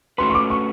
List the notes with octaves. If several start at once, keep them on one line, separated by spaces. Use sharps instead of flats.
A3 C#4 F#4 B4 C6
C#6
D6
C#6